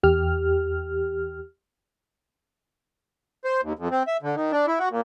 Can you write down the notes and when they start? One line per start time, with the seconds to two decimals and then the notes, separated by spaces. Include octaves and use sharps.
0.03 E2 G4 F6
3.45 C5
3.63 D#2
3.79 F2
3.91 C4
4.07 E5
4.22 D3
4.35 D#3
4.52 D4
4.67 E4
4.79 F#4
4.91 A#2